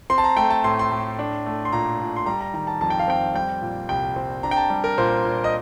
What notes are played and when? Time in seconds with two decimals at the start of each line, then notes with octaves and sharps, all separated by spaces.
0.10 C4 C6
0.18 A5
0.24 A#5
0.37 A3 G5
0.50 A5
0.64 A2 C6
0.79 C6
0.91 A2
1.19 D4
1.46 A3
1.65 C6
1.72 A#2 A#5
2.00 A#2
2.16 C6
2.26 G3 A#5
2.41 A#5
2.54 D#3 A#5
2.67 A5
2.81 F2 A5
2.90 G5
2.99 F5
3.08 C4 G5
3.34 G3 G5
3.62 A#2
3.89 C2 G5
4.16 C4
4.43 D4 A#5
4.51 G5
4.57 A5
4.70 G3
4.84 A#4
4.98 A#2 C5
5.25 A#2
5.44 D#5